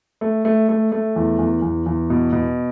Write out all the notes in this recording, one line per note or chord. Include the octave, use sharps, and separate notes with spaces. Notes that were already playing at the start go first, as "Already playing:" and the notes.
A3
A3
A3
A3
E2
E2
E2
E2
B2
B2